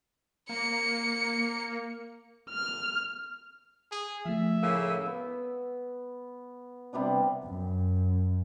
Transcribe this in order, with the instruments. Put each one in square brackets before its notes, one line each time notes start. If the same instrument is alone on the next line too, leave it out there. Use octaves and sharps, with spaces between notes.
[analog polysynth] A#3 [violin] C#7
[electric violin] F6
[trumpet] G#4
[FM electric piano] F3 A3 [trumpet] E5
[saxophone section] A2 C#3 A#3 [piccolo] E6
[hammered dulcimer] B3
C3 G3 B3 D4
[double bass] F#2